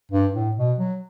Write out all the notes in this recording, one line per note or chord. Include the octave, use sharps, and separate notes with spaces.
G2
A2
B2
F#3